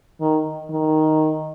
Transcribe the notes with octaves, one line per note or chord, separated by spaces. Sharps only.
D#3
D#3